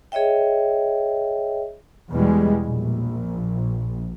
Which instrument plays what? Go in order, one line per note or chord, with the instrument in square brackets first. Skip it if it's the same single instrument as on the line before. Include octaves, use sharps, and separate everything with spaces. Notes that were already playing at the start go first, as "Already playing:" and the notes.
[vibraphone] G#4 C#5 D#5 E5 G5
[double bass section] E2 B2 G3 G#3
A#1